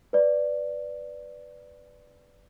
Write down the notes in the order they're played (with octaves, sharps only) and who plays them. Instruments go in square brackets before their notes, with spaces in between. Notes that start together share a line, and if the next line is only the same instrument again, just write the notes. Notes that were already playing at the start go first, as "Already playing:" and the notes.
[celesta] B4 D5